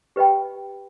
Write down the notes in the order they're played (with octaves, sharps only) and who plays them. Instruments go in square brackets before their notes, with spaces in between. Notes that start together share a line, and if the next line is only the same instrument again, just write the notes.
[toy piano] G4 B4 D#5 G5 B5